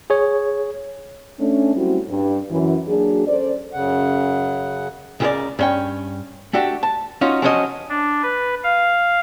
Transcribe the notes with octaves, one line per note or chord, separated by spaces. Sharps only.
G#4 C#5
A3 C#4 D4
F#3 G3 C4 C#4 E4 F#4
G2
F#2 E3
F#3 A#3 D4 F#4 G#4
C#4 A4 C5 D5
F#2 C#3 F#5
C#2 C#3 G4 G#4 A#4 D5
G2 C#4 G5
A3 D4 F#4 G4
A5
C#4 D#4 F4 F#4
F3 F#3 C#4 F#4 A4 D#5
D4
B4
F5